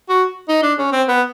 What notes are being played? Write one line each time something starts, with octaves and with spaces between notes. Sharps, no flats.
F#4
D#4
D4
C#4
C4
B3